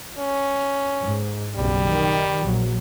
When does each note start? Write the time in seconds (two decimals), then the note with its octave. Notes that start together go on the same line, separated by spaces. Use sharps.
0.18 C#4
1.00 G#2
1.56 F#1 B1 G3
1.88 D#3
2.45 A#1 F#3